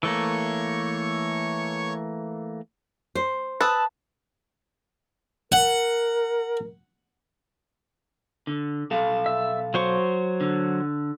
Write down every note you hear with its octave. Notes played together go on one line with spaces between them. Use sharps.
E3 A3 A#3 C#5 C#6
C5
B4 A5 D#6 E6
A#4 F#5
D3
B1 A4 F5
E5
F#3 C5 C#6
D3